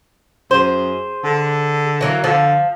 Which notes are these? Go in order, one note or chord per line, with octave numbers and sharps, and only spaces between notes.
F#2 G#4 C5
D3
E3 F#3 A#3
D3 F3